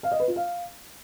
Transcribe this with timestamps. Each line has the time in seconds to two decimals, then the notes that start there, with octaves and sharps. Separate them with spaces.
0.03 F5
0.12 D#5
0.20 B4
0.28 F4
0.36 F5